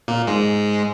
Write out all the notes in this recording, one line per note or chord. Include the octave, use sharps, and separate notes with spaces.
A#2 A#3
G#2 G#3